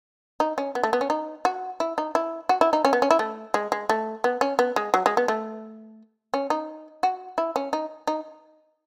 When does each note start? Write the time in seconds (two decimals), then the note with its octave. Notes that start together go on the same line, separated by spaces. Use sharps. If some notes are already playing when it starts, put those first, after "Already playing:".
0.40 D#4
0.58 C#4
0.75 B3
0.83 A3
0.93 B3
1.01 C#4
1.10 D#4
1.45 F#4
1.80 E4
1.98 D#4
2.15 E4
2.49 F#4
2.61 E4
2.73 D#4
2.85 C#4
2.93 B3
3.02 C#4
3.11 E4
3.19 A3
3.54 G#3
3.72 G#3
3.89 A3
4.24 B3
4.41 C#4
4.59 B3
4.76 G#3
4.94 F#3
5.06 G#3
5.17 B3
5.28 A3
6.34 C#4
6.50 D#4
7.03 F#4
7.38 E4
7.56 C#4
7.73 D#4
8.07 D#4